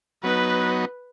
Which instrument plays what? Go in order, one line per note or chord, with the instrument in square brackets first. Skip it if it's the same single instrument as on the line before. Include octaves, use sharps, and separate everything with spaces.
[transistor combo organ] F#3 B3 D#4 [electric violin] B4